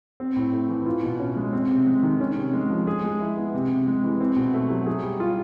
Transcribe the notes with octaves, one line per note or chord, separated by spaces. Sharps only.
C4
A2
A3
E3
F4
B2
C#4
G#3
C4
C3
G#3
D#3
C#4
C3
G#3
F3
G#4
G#3
E4
B3
C3
C3
G#3
E3
C4
B2
A3
F#3
G#4
G3
F4